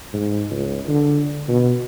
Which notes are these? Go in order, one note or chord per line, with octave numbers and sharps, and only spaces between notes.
G#2
C#2
D3
B2